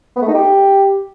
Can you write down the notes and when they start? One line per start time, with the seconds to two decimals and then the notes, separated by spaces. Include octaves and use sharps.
0.16 B3
0.22 A3
0.28 D#4
0.34 G4